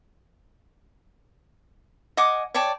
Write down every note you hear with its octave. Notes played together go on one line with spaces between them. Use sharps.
D#5 F#5 G#5 D6
C#5 D5 G5 A5